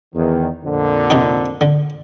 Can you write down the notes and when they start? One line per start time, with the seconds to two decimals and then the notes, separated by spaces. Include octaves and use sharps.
0.15 E2 D#3
0.64 F2 A#2 D3
1.10 C3 D#4 F#4
1.61 D3